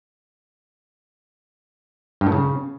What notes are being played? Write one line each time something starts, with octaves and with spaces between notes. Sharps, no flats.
G2
A2
C#3